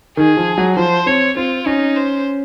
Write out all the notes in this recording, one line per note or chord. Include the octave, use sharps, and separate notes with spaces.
D#3 G#4
F3
F#3
F3 C5
C4 C#5
C4 F4
C#4 D#4
C5